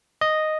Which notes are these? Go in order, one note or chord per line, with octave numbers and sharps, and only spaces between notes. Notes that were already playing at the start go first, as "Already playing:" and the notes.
D#5